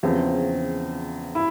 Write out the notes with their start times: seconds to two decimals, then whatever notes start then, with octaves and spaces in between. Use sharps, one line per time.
0.03 E2 C#3 F3 C4
1.35 E4